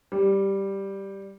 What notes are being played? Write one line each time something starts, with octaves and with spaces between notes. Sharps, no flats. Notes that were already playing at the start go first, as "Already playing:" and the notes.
G3